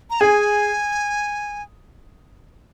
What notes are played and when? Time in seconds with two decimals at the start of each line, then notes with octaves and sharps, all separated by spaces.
0.10 A#5
0.20 G#4 G#5